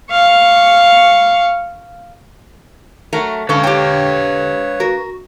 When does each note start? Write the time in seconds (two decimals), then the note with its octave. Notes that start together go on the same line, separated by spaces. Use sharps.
0.11 F5 C#6
3.13 F#3 A3 A#4
3.49 D3 C#4 A4 B4 F5
3.64 G4 C#5 G5
4.80 F#4 A#4